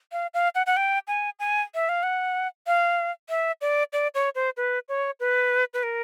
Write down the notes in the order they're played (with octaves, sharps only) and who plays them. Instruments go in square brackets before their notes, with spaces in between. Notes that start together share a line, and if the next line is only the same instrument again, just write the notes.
[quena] F5
F5
F#5
F#5
G5
G#5
G#5
E5
F5
F#5
F5
E5
D5
D5
C#5
C5
B4
C#5
B4
B4
A#4